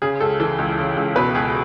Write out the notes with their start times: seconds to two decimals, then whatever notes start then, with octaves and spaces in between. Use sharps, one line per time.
0.02 C#3 G#4
0.21 C#2 A4
0.40 E3 A4
0.59 C#2
0.79 C#3
0.97 C#2
1.16 B2 B4
1.35 C#2 G#4